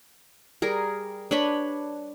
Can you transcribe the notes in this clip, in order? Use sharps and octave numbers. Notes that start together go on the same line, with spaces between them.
G3 G#4 A#4
D4 B4 C#5 B5